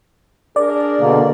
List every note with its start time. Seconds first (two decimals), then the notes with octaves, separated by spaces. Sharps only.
0.56 D4 G#4 A#4 D5
1.00 B2 D3 A#3